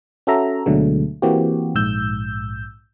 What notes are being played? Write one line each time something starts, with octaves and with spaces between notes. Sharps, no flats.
C#4 F#4 A4 E5 A#5
D2 B2 D3 F#3 G#3 A3
E3 A#3 C4 F#4 G4
A#1 G#2 E6 G6